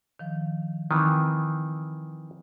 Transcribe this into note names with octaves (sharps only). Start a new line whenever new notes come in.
D#3 F3
D#3 E3 C4